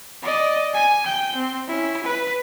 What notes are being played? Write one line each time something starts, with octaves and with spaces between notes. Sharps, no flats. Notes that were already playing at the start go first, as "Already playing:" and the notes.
D5 D#5
G#5
G5 G6
C4
C#4 E4
B4